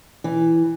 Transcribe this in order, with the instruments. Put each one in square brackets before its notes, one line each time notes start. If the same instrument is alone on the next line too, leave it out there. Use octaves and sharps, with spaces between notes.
[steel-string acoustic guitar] E3